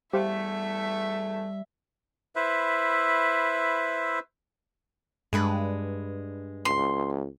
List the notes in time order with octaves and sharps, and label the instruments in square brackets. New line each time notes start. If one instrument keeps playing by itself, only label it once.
[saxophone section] E2 A3 [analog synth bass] G3 [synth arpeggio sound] G4 C5 F5 [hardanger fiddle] E5
[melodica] E4 B4 C5 E5
[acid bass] G2 [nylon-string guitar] G#3 D4 B4
[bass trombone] C#2 [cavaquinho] C6